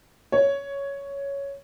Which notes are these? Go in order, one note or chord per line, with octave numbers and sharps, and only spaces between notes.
C#5